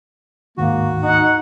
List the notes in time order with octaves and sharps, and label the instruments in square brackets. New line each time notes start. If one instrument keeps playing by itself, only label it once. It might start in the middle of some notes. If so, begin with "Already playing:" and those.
[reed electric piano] D2 G#2 D#3 [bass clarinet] A#3 [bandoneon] F#4
[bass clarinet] D#4 [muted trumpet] F#5